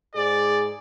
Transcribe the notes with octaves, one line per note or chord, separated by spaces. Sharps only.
G#2 G#4 D5